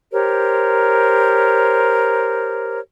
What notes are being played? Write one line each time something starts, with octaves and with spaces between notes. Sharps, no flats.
G4 A#4 C5 C#5